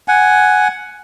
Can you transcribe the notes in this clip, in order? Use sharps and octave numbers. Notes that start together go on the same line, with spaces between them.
F#5 G#5